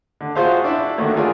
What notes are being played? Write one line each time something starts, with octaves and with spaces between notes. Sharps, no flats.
D3
F4 F#4 G#4 C5 E5 F5
D4 E4 F#4 E5
D3 D#3 F#3 A3 A#3
D3 E3 F4 G#4 A#4 D5